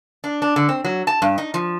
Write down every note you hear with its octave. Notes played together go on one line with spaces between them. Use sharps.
D4
D4
D3
C4
F#3
A5
G2
D#4
F3